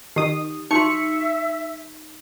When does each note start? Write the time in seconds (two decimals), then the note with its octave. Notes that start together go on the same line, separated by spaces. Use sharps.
0.16 D#3 G4 D#6
0.71 D#4 F#4 E5 C6 C#6 C#7